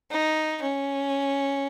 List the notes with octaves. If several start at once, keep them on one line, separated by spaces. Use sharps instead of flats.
D#4
C#4